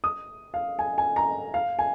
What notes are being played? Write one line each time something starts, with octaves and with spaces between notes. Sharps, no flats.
D#6
F5
G#5
G#5
A#5
F5
G#5